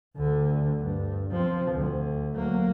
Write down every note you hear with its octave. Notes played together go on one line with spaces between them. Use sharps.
D2 D3
G2
F3 C4
D2
F#3 A#3